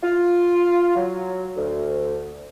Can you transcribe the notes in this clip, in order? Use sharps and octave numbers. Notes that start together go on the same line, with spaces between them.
F4
F#3
D2